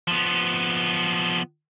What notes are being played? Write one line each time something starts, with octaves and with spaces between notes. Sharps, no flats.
F3 B3